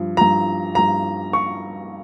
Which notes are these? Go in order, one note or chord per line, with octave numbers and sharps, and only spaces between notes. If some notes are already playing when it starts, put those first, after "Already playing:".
Already playing: G2 F3
G2 F3 A#5
G2 F3 A#5
C#6